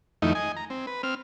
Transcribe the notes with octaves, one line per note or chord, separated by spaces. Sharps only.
F2 D#3 A3 D#4 E4
D#5 G#5
A#5
C4
B4
C4 F6